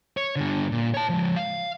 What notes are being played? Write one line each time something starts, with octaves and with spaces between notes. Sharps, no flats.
C#5
G2 D3
A#2
C#5 A5
F3 G#3
F5